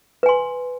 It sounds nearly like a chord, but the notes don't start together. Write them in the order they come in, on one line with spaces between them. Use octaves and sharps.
B4 G#5 C6